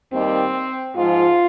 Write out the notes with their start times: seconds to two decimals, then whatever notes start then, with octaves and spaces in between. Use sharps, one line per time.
0.12 D#2 D#3 G3 C4
0.95 G#2 F3 F4